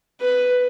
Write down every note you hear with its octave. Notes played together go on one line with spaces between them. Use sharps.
B4